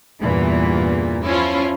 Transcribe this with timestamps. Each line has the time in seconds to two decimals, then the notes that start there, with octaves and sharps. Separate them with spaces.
0.21 E2 G2 A#2 E3
1.26 F3 C#4 E4 F4